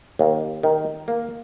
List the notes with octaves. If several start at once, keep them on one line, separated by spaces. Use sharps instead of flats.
D#2
D#3
A#3